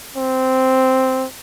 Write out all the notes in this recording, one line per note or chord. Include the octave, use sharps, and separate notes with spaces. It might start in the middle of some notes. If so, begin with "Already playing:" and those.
C4